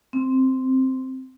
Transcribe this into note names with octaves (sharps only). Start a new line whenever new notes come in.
C4